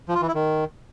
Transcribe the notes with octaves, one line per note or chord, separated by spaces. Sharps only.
F3
F4
E3
E4
D#3